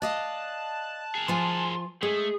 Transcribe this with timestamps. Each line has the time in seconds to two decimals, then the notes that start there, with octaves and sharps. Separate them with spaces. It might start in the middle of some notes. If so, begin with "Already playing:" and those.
0.02 D5 D#5 F5 A5 F#6
1.15 G#4 A#4
1.28 F3 F4 G#5 C6
2.03 G#3 A3 G#4